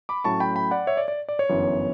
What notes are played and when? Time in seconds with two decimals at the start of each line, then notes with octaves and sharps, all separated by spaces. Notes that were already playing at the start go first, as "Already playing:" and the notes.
0.09 B5 D6
0.24 A2 F#3 A3 C#4 A5 C#6
0.40 G5 B5
0.56 G5 B5
0.71 D5 F#5
0.87 C#5 E5
0.97 D5
1.08 D5
1.29 D5
1.39 C#5
1.49 G1 F#2 E3 B3